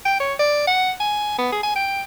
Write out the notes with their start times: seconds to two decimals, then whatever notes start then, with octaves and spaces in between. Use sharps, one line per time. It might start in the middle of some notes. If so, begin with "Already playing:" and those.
0.05 G5
0.20 C#5
0.39 D5
0.67 F#5
1.00 G#5
1.38 B3
1.52 G#4
1.63 G#5
1.76 G5